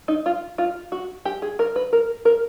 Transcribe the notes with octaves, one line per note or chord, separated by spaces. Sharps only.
D#4
F4
F4
F#4
G4
G#4
A#4
B4
A#4
A#4